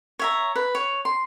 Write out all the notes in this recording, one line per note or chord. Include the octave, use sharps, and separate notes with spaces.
C#5 E5 A#5
B4
C#5
C6